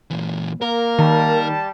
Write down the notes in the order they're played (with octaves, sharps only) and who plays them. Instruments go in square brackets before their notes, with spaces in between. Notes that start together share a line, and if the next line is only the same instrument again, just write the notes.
[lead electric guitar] A#2 E3
[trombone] A#3 [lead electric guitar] A#4
[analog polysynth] D#3 [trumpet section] G3 A5